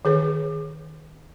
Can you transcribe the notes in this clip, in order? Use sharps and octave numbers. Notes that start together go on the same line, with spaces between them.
D#3 G#4 B4